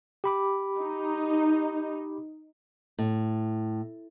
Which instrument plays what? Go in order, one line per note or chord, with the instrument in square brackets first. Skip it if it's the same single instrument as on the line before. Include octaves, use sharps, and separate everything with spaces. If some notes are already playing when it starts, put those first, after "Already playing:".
[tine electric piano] G4 B5 D6
[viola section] D#4
[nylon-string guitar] A2